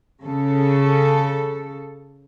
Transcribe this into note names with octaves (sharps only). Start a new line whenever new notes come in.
C#3 A4